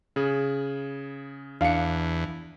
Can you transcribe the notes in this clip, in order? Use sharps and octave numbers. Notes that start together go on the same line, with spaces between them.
C#3 G#4
E2 D4 F5 C#7